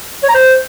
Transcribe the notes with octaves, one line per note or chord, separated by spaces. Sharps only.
C#5
A#5
C5